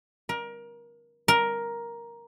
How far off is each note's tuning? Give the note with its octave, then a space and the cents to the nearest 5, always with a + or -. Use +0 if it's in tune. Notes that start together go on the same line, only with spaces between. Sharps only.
A#4 +25
A#4 +10